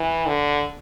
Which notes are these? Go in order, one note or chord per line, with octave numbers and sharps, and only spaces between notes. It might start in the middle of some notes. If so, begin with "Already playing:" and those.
Already playing: E3
D3